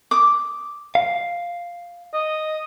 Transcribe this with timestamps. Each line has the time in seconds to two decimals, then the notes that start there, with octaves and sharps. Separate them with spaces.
0.11 D6 D#6
0.95 F5
2.14 D#5